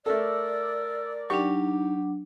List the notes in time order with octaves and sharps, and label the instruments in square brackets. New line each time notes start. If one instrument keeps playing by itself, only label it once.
[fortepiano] A3 A4 [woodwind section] A#4 D5 [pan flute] E6
[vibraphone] F#3 D4 [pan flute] D#4 [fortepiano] G4 C#6